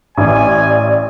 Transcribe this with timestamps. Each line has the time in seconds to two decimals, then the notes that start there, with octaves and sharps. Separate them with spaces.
0.18 A1 D5 G#5